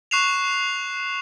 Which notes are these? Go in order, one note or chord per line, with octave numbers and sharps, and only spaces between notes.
C#6 F#6 C7 E7 F7